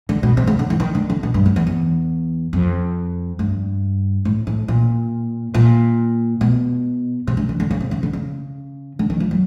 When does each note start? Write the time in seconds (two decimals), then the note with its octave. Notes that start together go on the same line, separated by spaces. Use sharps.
0.09 D3
0.23 B2
0.37 C3
0.47 C#3
0.59 D3
0.70 E3
0.80 D#3
0.95 D3
1.10 D3
1.23 B2
1.34 G2
1.46 F#2
1.56 E2
1.67 E2
2.53 F2
3.39 G2
4.25 A2
4.47 A2
4.68 A#2
5.54 A#2
6.41 B2
7.27 C3
7.37 D3
7.49 D#3
7.60 D3
7.71 C#3
7.81 C3
7.91 C#3
8.03 D3
8.13 C#3
8.99 D3
9.10 D#3
9.20 F3
9.31 F#3